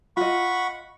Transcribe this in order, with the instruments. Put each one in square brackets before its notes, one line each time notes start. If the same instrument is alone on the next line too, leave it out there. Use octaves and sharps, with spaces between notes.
[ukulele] F4 D#5 [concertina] F#5 B5 C#6